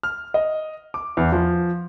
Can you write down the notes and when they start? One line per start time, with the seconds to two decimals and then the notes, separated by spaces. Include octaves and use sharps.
0.03 F6
0.34 D#5
0.94 D6
1.17 E2
1.32 F3